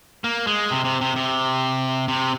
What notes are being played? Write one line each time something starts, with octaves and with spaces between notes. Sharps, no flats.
A#3
G#3
C3
C3
C3
C3
C3